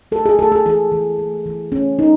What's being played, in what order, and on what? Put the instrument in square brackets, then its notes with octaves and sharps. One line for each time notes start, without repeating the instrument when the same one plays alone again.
[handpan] A3 A4
G#4
A3 A4
A4
E3 G#4
E3
A3
E3
A3 C#4
A3 D#4